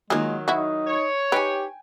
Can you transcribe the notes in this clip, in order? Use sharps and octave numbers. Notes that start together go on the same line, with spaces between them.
D#3 F#3 G#3 A#3 F4 G#4
D#4 E4 F#4
C#5
D#4 G4 B4 G5 G#5